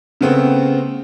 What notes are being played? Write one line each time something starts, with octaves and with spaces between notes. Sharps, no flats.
C#3 A3 B3 C4